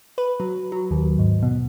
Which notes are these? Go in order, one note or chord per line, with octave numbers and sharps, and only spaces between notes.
B4
F#3
F#3
D#2
G#2
B2